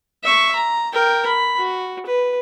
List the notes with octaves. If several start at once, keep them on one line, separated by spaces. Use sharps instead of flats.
E5 C#6
A#5
A#4 G5
B5
F#4
B4